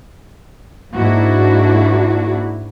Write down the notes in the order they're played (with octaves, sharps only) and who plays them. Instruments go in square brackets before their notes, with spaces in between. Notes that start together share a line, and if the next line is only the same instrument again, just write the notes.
[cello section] G#2 A#3 D4 E4 F#4